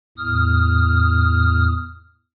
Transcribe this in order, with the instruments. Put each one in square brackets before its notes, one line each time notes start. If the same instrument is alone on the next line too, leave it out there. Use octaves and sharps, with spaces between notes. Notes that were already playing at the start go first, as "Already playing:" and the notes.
[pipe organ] E2 A2 D#6 F6